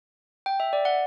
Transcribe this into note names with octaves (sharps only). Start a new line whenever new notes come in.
G5
E5
D5
F#5